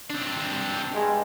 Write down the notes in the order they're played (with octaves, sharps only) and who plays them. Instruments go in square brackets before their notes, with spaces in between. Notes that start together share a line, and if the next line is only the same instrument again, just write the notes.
[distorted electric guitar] C4 D4
[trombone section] G2 G#3